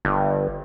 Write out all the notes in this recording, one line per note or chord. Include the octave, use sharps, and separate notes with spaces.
G1